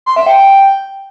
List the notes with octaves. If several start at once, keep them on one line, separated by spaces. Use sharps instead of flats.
C6
E5
G5